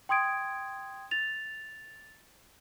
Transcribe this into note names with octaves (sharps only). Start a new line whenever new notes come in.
G5 C6 D#6 G#6 D7
A6 F7